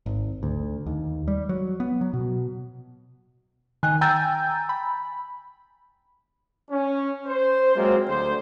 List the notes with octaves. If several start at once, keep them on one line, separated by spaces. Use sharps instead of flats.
G#1
D2
D#2
G3
F#3
B3
F#3
B2
D#3 G#5 F#6
G5 G#5 A#5 E6 G6 A6
B5
C#4
C5
F#3 G#3 A#3 C4 F4
D2 C5